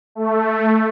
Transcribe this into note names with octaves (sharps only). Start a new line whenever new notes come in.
A3